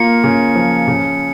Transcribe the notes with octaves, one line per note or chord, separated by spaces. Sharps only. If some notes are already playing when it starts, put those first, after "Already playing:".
Already playing: A#3 F4 C#7
C#3
F3
C#3